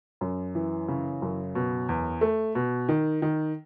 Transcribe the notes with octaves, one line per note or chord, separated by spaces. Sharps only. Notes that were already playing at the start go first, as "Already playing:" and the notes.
F#2
E3
C#3
F#2
B2
E2
A3
B2
D#3
D#3